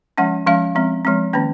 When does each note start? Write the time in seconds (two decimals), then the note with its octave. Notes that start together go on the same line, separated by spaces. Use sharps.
0.18 F3 G#3 C#4 F#5
0.46 F3 G#3 C#4 F5
0.75 F3 G#3 C4
1.05 F3 G#3 C4
1.33 D#3 A#3 C#4